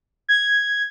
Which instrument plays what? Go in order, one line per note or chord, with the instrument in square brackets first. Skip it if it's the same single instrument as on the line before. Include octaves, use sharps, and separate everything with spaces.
[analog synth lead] G#6